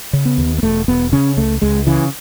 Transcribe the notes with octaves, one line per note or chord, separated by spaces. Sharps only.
C#3
B3
D#2
B3
E1 A3
E1 B3
C#3 C#4
C#2 A3
C#2 G#3
C#3 E3